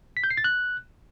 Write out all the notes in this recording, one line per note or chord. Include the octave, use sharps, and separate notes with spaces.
B6
G6
C7
A6
F#6